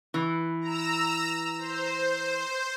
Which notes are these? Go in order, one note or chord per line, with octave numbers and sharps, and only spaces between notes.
E3
A#5 E6
C5